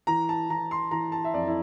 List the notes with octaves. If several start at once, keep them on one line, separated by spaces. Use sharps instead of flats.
E3 A#5
A5
E3 A#5
C6
E3 A#5
A5
E5
F2 D5
E4